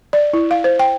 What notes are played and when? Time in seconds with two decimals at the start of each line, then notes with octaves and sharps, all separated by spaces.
0.13 D5
0.33 E4
0.51 F5
0.64 C5
0.79 G5